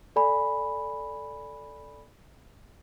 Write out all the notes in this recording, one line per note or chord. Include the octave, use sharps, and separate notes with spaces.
A4 D5 G#5 B5